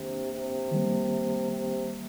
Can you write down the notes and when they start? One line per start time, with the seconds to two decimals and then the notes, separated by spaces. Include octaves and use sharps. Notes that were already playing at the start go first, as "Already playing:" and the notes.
Already playing: C3 D#3 A#3 D4
0.33 C3
0.72 D#3 G3 A#3
1.51 C3